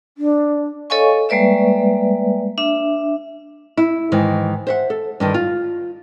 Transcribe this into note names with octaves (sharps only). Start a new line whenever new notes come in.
D4
A4 C#5 D#5 F5 G#5 C#6
G3 G#3 A#3 B4 D5 E5
D4 E5
E4
G#2 D#3 E3
C5 E5 F#5
A4
G2 D3 D#3
F4